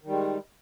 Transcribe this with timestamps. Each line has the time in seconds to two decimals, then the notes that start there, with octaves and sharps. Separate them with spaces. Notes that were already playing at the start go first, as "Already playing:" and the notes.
0.03 D#3
0.07 G3
0.11 G#3